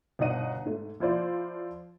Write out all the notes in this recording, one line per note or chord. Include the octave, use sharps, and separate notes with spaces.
G1 B2 D4 D#4 F#5 D#7
G#2 A3
F3 E4 F4 C5 D5